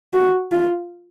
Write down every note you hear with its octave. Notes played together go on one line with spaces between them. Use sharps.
F#4
F4